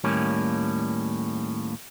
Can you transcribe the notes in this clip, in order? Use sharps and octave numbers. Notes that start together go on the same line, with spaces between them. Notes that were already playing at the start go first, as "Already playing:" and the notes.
D#2 A2 G3 A#3 C#4